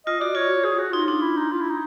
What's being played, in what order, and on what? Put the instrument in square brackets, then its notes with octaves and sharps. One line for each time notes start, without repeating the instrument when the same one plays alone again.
[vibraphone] F4 [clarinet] D#5
[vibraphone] F#4 [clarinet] D5
[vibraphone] F4 [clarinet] C#5
[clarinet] G#4
F#4
[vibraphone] D#4 [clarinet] F4
[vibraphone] D4 [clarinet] F4
[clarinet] E4
D#4
F4
E4
D#4